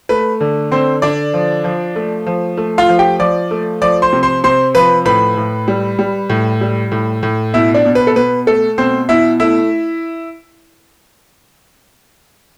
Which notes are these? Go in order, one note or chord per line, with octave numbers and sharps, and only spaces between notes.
A3 B4
D3
D3 C4 C5
D3 D4 D5
F3
F3
A3
F3
A3
F4 F5
F3
G4 G5
F3 D5 D6
A3
F3 D5 D6
C5 C6
C3
C5 C6
C3 C5 C6
F3 B4 B5
A2 B4 B5
A2
G3
G3
A2
G3
A2
A2
B2 E4 E5
D4 D5
B2
B4
A4
B2 B4
A3 A4
B2 C4 C5
B2 E4 E5
A3 E4 E5